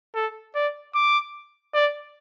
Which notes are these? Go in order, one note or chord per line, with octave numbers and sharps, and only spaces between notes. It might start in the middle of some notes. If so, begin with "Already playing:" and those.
A4
D5
D6
D5